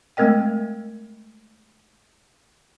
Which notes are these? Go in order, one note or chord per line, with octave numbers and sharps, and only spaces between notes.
G#3 A3 C4 A#4 D#5 G5